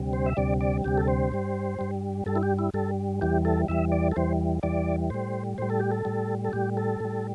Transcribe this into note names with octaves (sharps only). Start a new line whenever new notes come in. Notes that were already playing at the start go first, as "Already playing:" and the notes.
Already playing: D2 C3 G3
C5
E5
D2 C3 G3 D5
D5
D2 C3 G3 G4
A4
C5
G2 G3
G2 G3
G2 G3 A4
E4
G4
E4
G2 G3 A4
E2 E3 G3 G4
A4
E2 E3 G3 E5
D5
A4
E2 E3 G3 C5
E2 E3 G3 D5
A2 G3 C5
A2 G3 C5
A4
G4
A4
A2 G3
A4
A2 G3 G4
A4
A2 G3